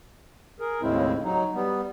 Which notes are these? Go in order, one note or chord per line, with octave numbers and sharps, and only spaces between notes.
G#4 A#4
D#2 A2 C#3 G#3 C4 E4
F#3 D#4
G3 B3